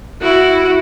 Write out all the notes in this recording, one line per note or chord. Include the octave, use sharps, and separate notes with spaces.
E4 F#4